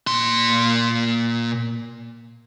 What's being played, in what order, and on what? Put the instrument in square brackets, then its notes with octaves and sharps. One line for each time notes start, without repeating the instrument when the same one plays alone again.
[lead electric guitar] A#2 C6